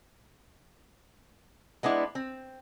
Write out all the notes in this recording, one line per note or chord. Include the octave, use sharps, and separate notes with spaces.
G#3 B3 D4 E4
C4